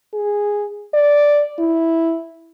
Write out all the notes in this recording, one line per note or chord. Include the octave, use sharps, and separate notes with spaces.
G#4
D5
E4